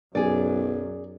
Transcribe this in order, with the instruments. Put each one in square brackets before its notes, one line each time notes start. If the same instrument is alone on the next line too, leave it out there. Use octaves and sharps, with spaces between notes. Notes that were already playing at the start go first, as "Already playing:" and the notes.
[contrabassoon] B1 [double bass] F#2 [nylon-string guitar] G#4 D5